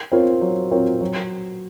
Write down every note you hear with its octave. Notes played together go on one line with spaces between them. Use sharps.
C4 F4 A#4 C#5
F#3
C4 F4 A#4 C#5
F#3